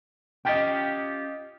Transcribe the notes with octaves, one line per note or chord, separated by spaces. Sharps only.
C#4 F4 G4 D#5 G5